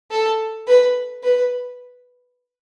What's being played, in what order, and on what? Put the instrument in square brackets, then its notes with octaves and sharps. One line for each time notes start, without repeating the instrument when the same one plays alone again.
[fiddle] A4
B4
B4